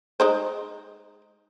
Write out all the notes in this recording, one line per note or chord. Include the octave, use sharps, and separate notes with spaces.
G#3 D#4 C5